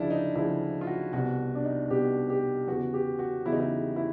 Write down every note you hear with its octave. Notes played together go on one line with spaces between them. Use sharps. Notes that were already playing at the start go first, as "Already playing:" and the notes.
Already playing: D2 C#3 F3 D4 E4 F4
D#4
D2 C#3 F3 E4
F4
F#4
C2 B2 F#4
D4
D#4
C2 B2 G4
G4
E2 C#3 E3 F#4
G4
F#4
E2 C#3 E3 E4
D#4
E4
E4